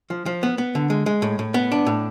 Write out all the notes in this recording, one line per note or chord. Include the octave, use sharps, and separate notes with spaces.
F3
F3
B3
B3
D3
G#3
G#3
A2
A2
B3
D4
A2